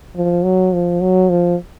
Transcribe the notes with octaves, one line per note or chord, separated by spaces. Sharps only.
F3
F#3
F3
F#3
F3